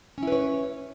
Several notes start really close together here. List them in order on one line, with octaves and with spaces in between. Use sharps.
C#4 E4 B4 C#5